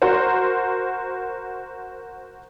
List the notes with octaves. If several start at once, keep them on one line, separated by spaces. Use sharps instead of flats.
F#4 A#4 C5